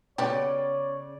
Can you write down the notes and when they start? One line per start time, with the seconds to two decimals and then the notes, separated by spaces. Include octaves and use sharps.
0.18 C#3 B3 F#4 G4 C#5 D5